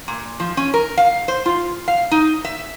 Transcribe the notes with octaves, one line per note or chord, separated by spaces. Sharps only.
A#2
F3
C#4
A#4
F5
C5
F4
F5
D#4
E5